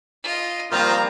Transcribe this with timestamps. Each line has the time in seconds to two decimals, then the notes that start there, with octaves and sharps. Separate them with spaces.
0.23 F4 D#5
0.72 D#3 F3 G3 A#3 C4 F4 A#5